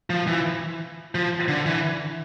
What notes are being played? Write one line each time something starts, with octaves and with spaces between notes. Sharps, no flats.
F3
E3
F3
D3
E3